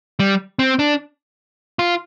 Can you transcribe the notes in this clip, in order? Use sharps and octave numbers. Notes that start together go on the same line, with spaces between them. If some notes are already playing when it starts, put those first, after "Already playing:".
G3
C4
D4
F4